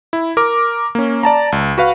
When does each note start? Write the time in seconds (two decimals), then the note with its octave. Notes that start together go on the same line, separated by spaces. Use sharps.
0.13 E4
0.37 A#4 D6
0.95 A#3 C#4
1.23 D5 A5 A#5
1.52 C#2
1.78 F#4 B4 F5